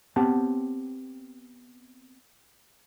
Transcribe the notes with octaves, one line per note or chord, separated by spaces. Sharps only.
B3 C4 G4 C#5 F#5 A5